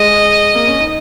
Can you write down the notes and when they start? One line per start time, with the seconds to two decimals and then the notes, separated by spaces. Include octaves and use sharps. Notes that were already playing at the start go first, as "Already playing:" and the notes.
Already playing: G#3 D#5
0.55 A#3
0.67 C#4
0.80 D#4